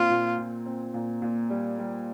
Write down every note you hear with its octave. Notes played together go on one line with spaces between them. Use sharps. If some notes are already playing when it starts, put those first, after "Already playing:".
Already playing: A#2 C4 F4
A#2
A#2
C4
A#2
A#2
G3
G3